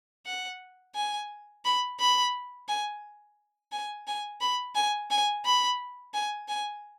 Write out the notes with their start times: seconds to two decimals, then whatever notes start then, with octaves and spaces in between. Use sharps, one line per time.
0.26 F#5
0.95 G#5
1.65 B5
2.00 B5
2.69 G#5
3.72 G#5
4.07 G#5
4.41 B5
4.75 G#5
5.11 G#5
5.45 B5
6.14 G#5
6.48 G#5